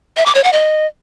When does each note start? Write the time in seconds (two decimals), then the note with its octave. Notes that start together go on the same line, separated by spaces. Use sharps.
0.17 E5
0.26 D6
0.35 C#5
0.44 F#5
0.53 D#5